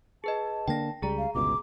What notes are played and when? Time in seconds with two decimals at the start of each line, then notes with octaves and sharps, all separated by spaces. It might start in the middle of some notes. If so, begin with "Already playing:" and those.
0.24 G#4 B4 D#5 A5
0.68 D3 A#3 D4 G5 A#6
1.02 C#2 G3 G#4 A#5
1.18 F5
1.35 G1 C#2 B2 D6